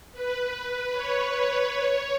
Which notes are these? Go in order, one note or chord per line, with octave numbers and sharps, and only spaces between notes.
B4
C#5
C#5